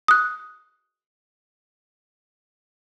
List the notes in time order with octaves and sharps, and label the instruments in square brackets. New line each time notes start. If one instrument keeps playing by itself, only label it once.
[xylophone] D#6 F#6